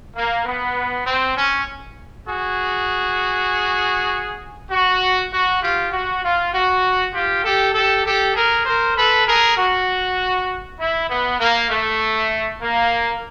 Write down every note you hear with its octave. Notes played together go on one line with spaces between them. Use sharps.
A#3
B3
C4
C#4
F#4 G#4
F#4
F#4
F4 G4
F#4
F4
F#4
F4 G4
G4 A4
G4 A4
G4 A4
G#4 A#4
A#4 C5
A4 B4
G#4 A#4
F#4
E4
B3
A#3
A3
A#3